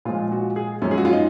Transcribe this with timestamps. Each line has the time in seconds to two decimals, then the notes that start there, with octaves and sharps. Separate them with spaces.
0.05 A#2 F3 G#3 F4
0.32 F#4
0.56 G#4
0.82 F#2 F3 G#3 C#4
0.91 G#4
0.98 F#4
1.05 F4
1.13 D#4